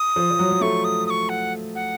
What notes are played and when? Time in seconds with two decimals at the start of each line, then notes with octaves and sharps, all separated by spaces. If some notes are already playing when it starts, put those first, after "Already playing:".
Already playing: D#6
0.16 F3
0.31 F3
0.39 F#3
0.51 F#3
0.61 A3 C#6
0.84 D#6
1.06 D#6
1.10 C#6
1.29 F#5
1.75 F#5